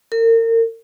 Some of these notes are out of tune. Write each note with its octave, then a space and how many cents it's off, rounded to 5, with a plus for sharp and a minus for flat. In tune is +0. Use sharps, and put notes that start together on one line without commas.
A#4 -35